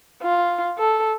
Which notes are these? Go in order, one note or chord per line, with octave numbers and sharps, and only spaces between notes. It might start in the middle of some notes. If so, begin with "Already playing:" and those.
F4
A4